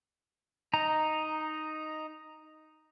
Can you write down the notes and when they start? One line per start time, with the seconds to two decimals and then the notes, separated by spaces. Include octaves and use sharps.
0.74 D#4 A#5